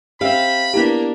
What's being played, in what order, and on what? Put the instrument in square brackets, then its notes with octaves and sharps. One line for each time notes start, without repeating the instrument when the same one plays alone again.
[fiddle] C4 [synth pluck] G4 E5 [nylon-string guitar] F5 [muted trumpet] B5
[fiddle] A#3 D4 [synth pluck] B3 E4 G4